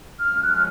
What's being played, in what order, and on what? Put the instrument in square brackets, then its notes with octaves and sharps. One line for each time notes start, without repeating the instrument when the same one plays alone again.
[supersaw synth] F#2 F3 G#3 C#4 [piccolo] F6
[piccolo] F#6
F6